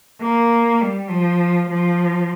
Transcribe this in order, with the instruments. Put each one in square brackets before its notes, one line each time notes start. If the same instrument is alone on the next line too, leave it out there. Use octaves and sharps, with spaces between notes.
[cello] A#3
G3
F3
F3